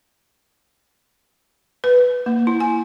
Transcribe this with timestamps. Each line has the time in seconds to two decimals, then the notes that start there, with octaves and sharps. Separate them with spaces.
1.84 B4
2.26 A#3
2.47 E4
2.60 G#5